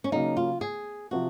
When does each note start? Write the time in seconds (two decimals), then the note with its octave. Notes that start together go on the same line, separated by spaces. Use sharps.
0.04 C#4
0.12 C#3 F#3 A#3 D#4
0.37 F4
0.61 G#4
1.11 C3 F3 F#4